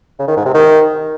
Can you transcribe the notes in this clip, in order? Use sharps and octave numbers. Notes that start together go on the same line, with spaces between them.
C#3
D#3
G#2
C3
D#3